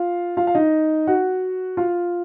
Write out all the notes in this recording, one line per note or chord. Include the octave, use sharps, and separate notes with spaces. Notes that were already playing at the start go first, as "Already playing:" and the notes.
Already playing: F4 F5
F4 F5
F5
D#4 D#5
F#4 F#5
F4 F5